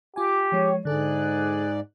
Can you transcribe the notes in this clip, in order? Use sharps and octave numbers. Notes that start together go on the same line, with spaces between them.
F4 G4 G#5 D6
F3 G#3 C#5
G#2 D3 G#4 A4 D5 F#6